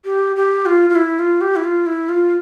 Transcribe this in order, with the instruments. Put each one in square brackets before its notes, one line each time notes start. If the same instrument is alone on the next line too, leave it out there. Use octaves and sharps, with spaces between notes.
[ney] G4
G4
F4
F4
E4
F4
G4
E4
F4
E4
F4